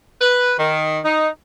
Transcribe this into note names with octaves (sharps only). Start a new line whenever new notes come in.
B4
D#3
D#4